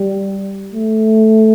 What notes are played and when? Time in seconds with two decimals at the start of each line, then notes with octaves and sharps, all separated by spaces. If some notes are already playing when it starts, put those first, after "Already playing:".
Already playing: G3
0.73 A3